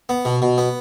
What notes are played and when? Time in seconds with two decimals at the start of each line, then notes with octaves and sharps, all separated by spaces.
0.09 B3
0.25 B2
0.42 B2
0.58 B3